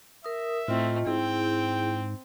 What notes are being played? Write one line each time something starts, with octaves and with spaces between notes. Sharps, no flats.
A#4 E5 D#6
A2 A3 C4 F4 D#5
G#2 C4 E4 G#4 G5